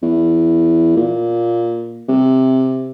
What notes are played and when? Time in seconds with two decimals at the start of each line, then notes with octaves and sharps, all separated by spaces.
0.03 E2
0.97 A#2
2.09 C3